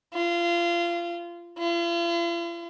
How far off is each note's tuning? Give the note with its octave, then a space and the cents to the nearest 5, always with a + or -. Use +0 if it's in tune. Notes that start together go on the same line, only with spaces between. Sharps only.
F4 -25
F4 -45